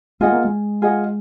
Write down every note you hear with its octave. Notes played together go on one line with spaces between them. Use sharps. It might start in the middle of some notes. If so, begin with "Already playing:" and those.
G#3 F4 G#4 D#5 F#5
A#3
G#3
F4 G#4 D#5 F#5